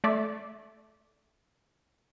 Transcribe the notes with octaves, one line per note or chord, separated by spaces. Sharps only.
A3 D5 E5